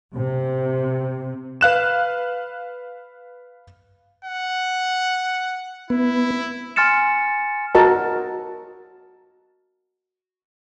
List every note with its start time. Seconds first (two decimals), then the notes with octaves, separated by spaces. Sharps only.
0.14 C3
1.61 B4 F5 F#6 E7
4.25 F#5
5.90 B3 E4
6.76 G#5 C6 F6 A6 C#7 E7
7.75 F#4 A#4 D#5 A5